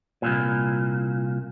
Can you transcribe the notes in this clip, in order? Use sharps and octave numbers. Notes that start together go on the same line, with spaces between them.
C2 F2 A#2